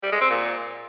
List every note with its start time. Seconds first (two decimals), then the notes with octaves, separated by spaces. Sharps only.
0.03 G3
0.12 G#3
0.21 C4
0.30 A#2